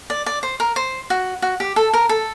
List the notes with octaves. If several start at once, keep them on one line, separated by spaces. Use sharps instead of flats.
D5
D5
C5
A#4
C5
F#4
F#4
G4
A4
A#4
A4